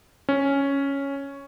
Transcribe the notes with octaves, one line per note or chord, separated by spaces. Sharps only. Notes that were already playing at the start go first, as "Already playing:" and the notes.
C#4